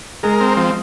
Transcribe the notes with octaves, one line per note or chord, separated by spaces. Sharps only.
G#3 G#4 A#4
C4
F3